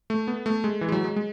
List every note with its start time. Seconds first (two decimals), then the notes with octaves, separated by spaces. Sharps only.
0.10 A3
0.28 B3
0.46 A3
0.64 G#3
0.81 E3
0.89 G#3
0.92 F#3
1.04 G#3
1.16 G#3